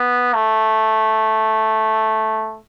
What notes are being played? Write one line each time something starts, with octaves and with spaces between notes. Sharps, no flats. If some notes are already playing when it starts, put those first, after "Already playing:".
Already playing: B3
A3